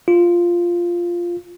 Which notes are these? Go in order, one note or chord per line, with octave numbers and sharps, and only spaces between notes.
F4